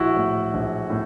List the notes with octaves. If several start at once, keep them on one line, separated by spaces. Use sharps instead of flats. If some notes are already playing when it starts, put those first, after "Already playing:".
Already playing: A#1 E4 F#4
A2
A#1
A2